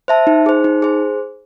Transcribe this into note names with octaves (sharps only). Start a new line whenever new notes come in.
C5 E5 A5
D#4
G#4 C5
D#4
G#4 C5